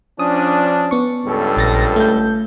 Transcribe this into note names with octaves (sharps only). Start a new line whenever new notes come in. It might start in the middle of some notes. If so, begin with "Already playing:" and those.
F3 C#4 D4 D#6
B3 C#6
C#2 G2 A4
A#1 A6 A#6
A3 G6